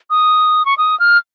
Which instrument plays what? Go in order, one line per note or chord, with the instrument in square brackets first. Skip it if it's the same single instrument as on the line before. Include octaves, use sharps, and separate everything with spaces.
[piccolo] D#6
C#6
D#6
F6